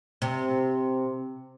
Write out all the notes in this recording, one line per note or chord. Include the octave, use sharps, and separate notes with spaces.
C3